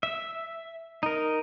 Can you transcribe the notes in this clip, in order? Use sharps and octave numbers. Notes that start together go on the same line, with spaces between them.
E5
D#4 A#4